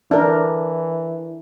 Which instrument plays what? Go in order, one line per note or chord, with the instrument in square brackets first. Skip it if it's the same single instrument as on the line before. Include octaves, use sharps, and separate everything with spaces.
[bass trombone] E3 [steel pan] D4 A#4